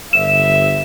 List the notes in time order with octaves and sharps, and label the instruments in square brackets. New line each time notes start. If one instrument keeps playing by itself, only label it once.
[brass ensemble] G1 E5 [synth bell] E7